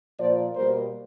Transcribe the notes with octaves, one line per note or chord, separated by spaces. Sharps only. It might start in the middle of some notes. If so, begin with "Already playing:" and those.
A#2 F3 A#3 C5 D5
B2 G3 A#3 A#4 C5